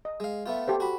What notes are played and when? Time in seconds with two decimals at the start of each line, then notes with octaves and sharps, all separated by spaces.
0.05 D#5
0.20 G#3 F5
0.46 A3 B3 F4
0.68 G4 A4 C5
0.80 F#4 B5